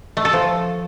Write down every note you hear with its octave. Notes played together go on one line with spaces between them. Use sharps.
A3
A4
F3